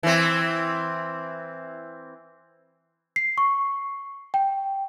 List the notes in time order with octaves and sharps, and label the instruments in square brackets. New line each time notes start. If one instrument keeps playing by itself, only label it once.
[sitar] E3 C4
[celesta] C7
C#6
G5